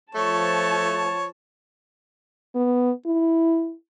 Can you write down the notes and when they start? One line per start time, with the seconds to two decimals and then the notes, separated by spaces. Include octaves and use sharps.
0.15 F3 A3 C#5 A5
2.55 B3
3.06 E4